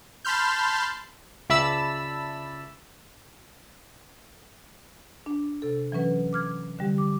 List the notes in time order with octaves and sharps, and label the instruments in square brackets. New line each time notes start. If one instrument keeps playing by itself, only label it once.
[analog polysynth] A5 B5 C6 F6 G6
[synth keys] C#2 D5 E5 A5 B5 E6
[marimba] D4
C3 A4
E3 F#3 C#4 B4
D6 F6 G#6
D3 G3 G4
D6